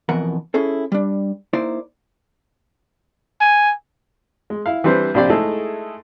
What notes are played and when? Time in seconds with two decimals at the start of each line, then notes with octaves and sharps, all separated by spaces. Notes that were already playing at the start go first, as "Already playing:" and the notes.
0.09 F2 B2 E3 A#4 F#5 A#5
0.54 C#4 E4 G#4 A4
0.92 G3 D4
1.53 A#3 D#4 E4 C5 D5
3.41 G#5
4.50 G#3
4.66 E4 F5
4.84 E3 G3 C4 D4 B4 C5
5.14 A#1 C3 D4 G4 C5 D5
5.30 G#3 A3 D#4 E4 G#4 A4